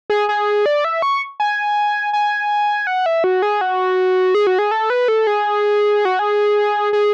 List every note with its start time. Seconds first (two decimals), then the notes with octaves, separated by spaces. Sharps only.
0.10 G#4
0.29 G#4
0.66 D5
0.85 E5
1.02 C#6
1.40 G#5
2.13 G#5
2.87 F#5
3.06 E5
3.24 F#4
3.42 G#4
3.61 F#4
4.35 G#4
4.47 F#4
4.59 G#4
4.71 A4
4.90 B4
5.08 A4
5.27 G#4
6.05 F#4
6.19 G#4
6.93 G#4